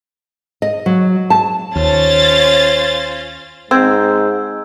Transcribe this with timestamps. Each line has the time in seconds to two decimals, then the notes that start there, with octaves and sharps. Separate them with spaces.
0.62 D#5
0.86 F#3
1.30 A5
1.76 D#2 C#4 F4 C5 C#5 A6
3.71 G#2 C4 E6 G6 G#6